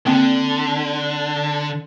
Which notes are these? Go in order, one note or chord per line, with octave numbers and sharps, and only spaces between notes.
D3 A#3 C4 G5